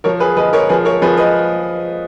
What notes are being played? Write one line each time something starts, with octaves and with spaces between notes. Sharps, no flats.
F3 A#4 C#5
G#4 B4
F3 B4 D#5
A#4 C#5
F3 G#4 B4
A#4 C#5
F3 G#4 B4
B4 D#5